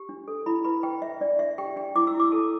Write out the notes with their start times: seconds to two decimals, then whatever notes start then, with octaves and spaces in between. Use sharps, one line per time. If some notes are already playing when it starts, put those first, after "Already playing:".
Already playing: G4
0.09 D4
0.28 A4
0.46 E4 B5
0.64 B4 B5
0.83 B4 G5
1.02 B4 E5
1.21 D4 D5
1.39 D4 E5
1.58 G4 G5
1.76 D4 G5
1.95 E4 D6
2.07 E6
2.14 E4
2.20 D6
2.32 A4 A5